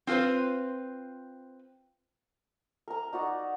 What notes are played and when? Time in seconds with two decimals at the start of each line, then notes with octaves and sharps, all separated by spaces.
0.07 C4 F4 G4 B4 C5
2.88 A#4 A#5
3.13 D#4 F#4 D5 F#5